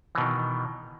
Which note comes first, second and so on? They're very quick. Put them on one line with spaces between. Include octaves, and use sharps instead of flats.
E3 B2 D#3